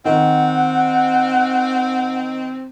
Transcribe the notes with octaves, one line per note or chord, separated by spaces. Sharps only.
D#3 C4 F#5